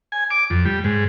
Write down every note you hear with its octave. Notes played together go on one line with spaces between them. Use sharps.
G#5
D6
F2
G3
G#2